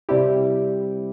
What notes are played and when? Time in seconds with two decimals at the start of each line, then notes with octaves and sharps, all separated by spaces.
0.09 C3 G3 C4 E4 G4